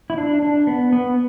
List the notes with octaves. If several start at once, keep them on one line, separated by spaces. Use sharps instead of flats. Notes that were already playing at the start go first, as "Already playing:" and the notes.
E4
D4
D4
B3
B3